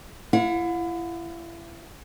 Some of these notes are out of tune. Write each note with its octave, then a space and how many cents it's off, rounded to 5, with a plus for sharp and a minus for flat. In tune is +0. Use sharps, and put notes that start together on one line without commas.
E4 +35 F#5 -45